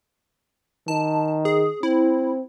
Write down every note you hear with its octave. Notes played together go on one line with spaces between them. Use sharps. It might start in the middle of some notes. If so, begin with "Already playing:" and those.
D#3 A5
G#4
C4 E4